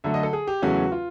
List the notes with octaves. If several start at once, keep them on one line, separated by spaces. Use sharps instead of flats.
D3 F#3 A3 E5
D#5
A4
G#4
G4
E2 C#3 F#3 A3 C#4 F#4
F4